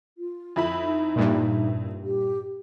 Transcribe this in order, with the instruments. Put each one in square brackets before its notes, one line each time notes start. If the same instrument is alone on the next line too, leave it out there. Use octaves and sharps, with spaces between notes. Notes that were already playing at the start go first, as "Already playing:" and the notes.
[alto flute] F4
[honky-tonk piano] F2 E4 B5
[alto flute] D#4
[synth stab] G2 A#2
[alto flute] G4